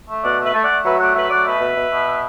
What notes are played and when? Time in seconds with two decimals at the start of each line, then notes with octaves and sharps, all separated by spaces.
0.09 A3
0.24 B2 D5 F#5
0.39 A3 B4 E5
0.54 A3
0.64 D5 F#5
0.70 A3
0.85 F#3 B4 E5
1.00 A3 D5 F#5
1.15 F#3 B4 E5
1.31 A3 D5 F#5
1.45 B2 B4 E5
1.61 B2
1.76 B2
1.92 B2